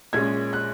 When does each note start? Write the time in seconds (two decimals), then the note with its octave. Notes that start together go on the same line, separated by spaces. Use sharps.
0.13 A#1 A#2 G#3 C#4 G#6
0.53 F#6